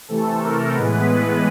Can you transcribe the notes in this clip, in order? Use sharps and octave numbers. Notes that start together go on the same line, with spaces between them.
C3 E3 A3 A4
A#4
A2 E3 G#3 B3 B4